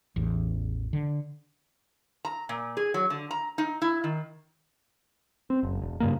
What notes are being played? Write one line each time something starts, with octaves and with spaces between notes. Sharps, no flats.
A1 E2
D3
A#5
A#2
G#4
F#3
D3
A#5
D#4
E4
D#3
C4
F#1
E1
G2 C#3 A#3